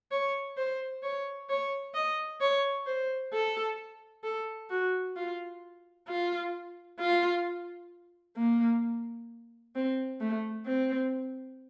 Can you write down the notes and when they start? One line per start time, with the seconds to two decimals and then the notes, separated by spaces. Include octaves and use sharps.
0.11 C#5
0.57 C5
1.03 C#5
1.49 C#5
1.95 D#5
2.41 C#5
2.86 C5
3.33 A4
4.24 A4
4.70 F#4
5.16 F4
6.08 F4
7.00 F4
8.37 A#3
9.75 C4
10.20 A3
10.67 C4